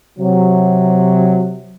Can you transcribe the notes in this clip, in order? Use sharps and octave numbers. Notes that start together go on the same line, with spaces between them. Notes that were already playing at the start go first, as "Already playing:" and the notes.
C3 F#3